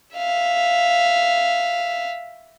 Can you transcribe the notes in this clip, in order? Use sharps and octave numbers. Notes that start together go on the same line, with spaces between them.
E5 F5